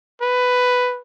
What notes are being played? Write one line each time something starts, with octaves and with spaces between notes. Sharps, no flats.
B4